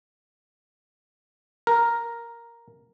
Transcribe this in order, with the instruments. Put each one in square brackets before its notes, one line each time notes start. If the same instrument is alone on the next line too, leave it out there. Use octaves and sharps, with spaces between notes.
[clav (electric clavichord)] A#4